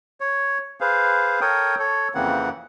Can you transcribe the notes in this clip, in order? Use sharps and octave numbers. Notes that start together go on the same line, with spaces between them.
C#5
G#4 B4 C5 F5
A4 A#4 C#5 G5 D#6
A4 C#5
F2 C#3 E3 A#3 C4 F#5